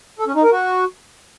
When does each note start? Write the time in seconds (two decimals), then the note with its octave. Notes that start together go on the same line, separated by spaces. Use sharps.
0.19 A4
0.27 C#4
0.35 D#4
0.43 A#4
0.52 F#4